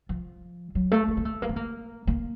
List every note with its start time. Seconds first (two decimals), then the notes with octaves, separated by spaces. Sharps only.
0.09 F3
0.75 F#3
0.91 A3
1.08 A3
1.17 A#3
1.25 A3
1.42 A#3
1.49 B3
1.56 A#3
2.07 A#3